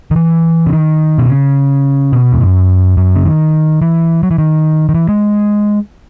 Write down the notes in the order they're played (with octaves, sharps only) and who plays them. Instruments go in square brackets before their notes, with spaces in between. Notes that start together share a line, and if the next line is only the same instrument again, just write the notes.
[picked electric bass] D#3
E3
C#3
D#3
B2
C#3
B2
E2
F#2
F#2
C#3
D#3
E3
F#3
E3
D#3
D#3
E3
G#3